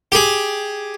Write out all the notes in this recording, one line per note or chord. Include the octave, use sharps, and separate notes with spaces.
G4 G#4